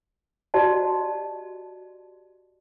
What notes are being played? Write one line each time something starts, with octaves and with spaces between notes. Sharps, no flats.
F#4 G4 D5 D#5 A5